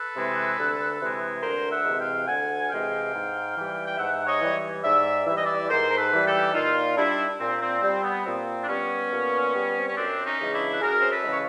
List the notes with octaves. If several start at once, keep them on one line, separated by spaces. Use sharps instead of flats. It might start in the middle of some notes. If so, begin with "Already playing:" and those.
Already playing: A4 B4
C3 E3 G#3
D2
C3 E3 G#3
D2 A#4 C5
E5 F#5
C3 E3 G#3
F5 G5
D2 F#5 G#5
C3 E3 G#3 F5 G5
G#2
E3
G3
G5
G#2 E5 F#5
C#5 D#5
E3 G3
G#2 D5 E5
E3 G3 E5
D#5
D5 E5
G#2 A#4 C5
A#4
A4 B4
E3 G3
G4 A4
A#2 D#4 F4
G3 D4 E4
A#2 C4
C4
G3 C4
B3
A#2 C4
D4
G3 B3 C#4
A#2
G3
C4
C#4
F#2 C4 D4
C#4 D#4
C#3 E3 G#3
D4 E4
B4
F#2 G#4 A#4
C5
A4 B4
C#3 E3 G#3
C#5